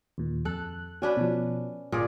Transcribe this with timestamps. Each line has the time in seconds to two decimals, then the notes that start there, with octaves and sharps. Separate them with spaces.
0.18 D#2 A#2
0.45 F2 A4 F#6
1.02 C#4 D4 F#4 B4
1.17 B2 F3
1.92 G1 A#2 G#4 D5